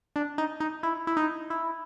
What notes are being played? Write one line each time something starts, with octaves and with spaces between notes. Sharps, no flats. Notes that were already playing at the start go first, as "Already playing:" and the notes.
D4
D#4
D#4
E4
E4
D#4
E4